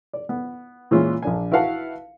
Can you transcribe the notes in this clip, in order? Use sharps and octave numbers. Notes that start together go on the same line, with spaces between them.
D5
B3
A#2 E3 G#3 C#4 F4
A#1 D4 G#5
E4 F#4 B4 F5 F#5 A5